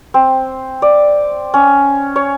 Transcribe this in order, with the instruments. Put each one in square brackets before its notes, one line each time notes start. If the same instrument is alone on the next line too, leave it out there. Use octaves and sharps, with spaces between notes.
[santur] C4
D5
C#4
C#5